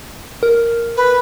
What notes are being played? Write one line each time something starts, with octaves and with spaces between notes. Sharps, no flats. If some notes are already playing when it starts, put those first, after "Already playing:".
A#4
B4